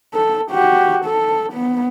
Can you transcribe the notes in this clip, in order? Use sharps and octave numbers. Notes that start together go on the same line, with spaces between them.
A4
F#4 G4
A4
B3